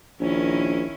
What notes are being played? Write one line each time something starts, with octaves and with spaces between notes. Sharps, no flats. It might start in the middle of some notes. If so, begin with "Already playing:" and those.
A#1 D#3 C#4 E4